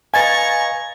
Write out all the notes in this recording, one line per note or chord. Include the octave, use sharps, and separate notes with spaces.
B4 D#5 F5 G#5 A#5 C#6 G#6 A6